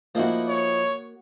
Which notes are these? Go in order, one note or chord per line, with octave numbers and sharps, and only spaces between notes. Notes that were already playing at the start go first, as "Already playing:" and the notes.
F3 A#3 D#4 E4 F#4
C#5